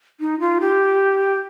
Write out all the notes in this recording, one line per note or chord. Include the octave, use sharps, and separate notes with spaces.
D#4
F4
G4